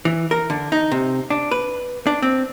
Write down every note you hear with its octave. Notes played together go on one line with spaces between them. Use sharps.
E3
A#4
D3
D#4
C3
D4
B4
D4
C4